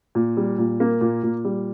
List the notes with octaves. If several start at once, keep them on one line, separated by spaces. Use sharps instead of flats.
A#2
G3
A#2
A#3
A#2
A#2
G3